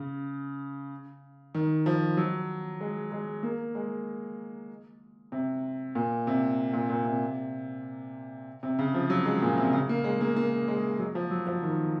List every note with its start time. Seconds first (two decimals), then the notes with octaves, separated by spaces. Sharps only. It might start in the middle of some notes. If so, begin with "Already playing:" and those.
Already playing: C#3
1.55 D#3
1.86 F3
2.17 F#3
2.81 G#3
3.12 G#3
3.43 A#3
3.75 G#3
5.32 C3
5.95 A#2
6.27 C3
6.73 A#2
6.90 A#2
7.05 C3
8.63 C3
8.79 C#3
8.94 F3
9.10 F#3
9.25 G#3
9.42 A#2
9.57 C3
9.73 C#3
9.89 A#3
10.04 G#3
10.21 A#3
10.36 A#3
10.68 G#3
10.99 F#3
11.15 F3
11.30 F#3
11.47 F3
11.63 D#3